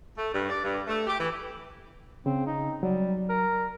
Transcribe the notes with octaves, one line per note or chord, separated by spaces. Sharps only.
A3
G2
D5
G2
A3
G4
E3
C#3 C4
D#4
F#3 G3
A#4